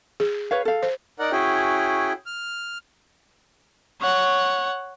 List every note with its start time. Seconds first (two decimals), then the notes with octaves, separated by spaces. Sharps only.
0.20 G#4
0.51 B4 C#5 F5
0.65 A4 F5
0.83 C5
1.19 D#4 A#4 D5 F#5
1.31 C#4 E4 F#4 G#4 G5
2.26 F6
4.01 C#5 F#5